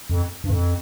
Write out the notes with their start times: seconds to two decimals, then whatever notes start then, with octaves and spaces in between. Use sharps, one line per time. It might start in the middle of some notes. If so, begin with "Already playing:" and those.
0.10 F2
0.44 G2
0.50 F2